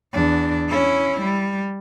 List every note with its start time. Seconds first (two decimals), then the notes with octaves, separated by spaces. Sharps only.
0.13 E2 D4
0.69 C#4 E4
1.21 G3